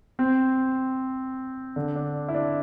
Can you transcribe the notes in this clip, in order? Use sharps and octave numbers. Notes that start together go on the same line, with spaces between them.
C4
D3
D4
E4
D4